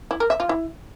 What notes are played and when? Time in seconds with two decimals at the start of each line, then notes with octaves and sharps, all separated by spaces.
0.11 E4
0.20 A#4
0.30 E5
0.40 F4
0.49 E4